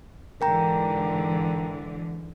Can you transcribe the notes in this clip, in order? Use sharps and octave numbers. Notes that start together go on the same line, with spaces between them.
G#2 D3 E3 A#4 G5 A#5